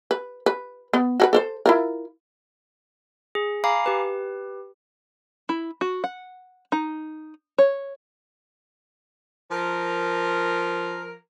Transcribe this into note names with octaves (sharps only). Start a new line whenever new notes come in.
B4
B4
B3
F#4 A4 B4
A4 A#4 C5
E4 F4 A#4
G#4
F5 G#5 A#5 B5 D6 C7
G4 B4
E4
F#4
F#5
D#4
C#5
F3 A#4